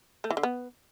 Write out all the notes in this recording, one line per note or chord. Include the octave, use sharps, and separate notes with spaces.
A3
E3
D3
B3